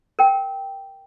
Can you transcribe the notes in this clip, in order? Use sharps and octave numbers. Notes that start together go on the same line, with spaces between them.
A#4 G5